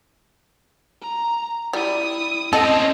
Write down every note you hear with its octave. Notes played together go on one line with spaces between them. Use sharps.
A#5
G3 E4 D#6
C4 C#4 A4 D#5